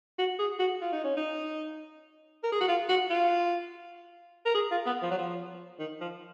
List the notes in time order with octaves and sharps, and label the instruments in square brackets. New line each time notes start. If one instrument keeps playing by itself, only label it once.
[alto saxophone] F#4
G#4
F#4
F4
D#4
C#4
D#4
A#4
G#4
F#4
F4
F#4
F4
A#4
G#4
F4
B3
F3
F#3
F3
D#3
F3